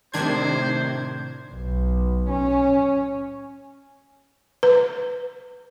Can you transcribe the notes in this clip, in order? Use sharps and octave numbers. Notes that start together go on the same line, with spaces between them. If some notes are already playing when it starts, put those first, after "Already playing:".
A2 C3 D#3 D4 C5 G#6
B1
C#4
B4